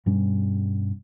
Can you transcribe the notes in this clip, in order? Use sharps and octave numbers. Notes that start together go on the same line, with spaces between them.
G2 B2 G3 C#4